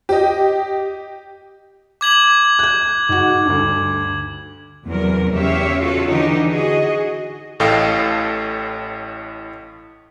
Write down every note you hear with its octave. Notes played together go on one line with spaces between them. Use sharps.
G4 D#5
D6 G#6 F#7
F#6 G6
G#2 F#4
D2 G2
E2 C3 F#3 A#4
E2 C#3 G4 C#5 E5 F5
F4 F#4 A4 C#5
D3 E3 D4 D#4 G4
F#4 G#4 D#5
A1 A2 A4 D#5 F5 G5